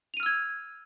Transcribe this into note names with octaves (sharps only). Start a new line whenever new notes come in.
E6 F6 G#6 D#7 F7